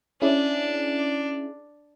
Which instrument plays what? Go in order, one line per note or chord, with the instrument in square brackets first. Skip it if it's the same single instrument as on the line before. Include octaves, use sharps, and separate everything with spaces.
[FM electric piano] C#4 E4 G#4 [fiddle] D4